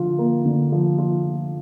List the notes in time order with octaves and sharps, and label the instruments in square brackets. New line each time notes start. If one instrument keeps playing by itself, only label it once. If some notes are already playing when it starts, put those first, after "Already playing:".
Already playing: [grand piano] D3 F3 F4
A#3
D3
F3
F4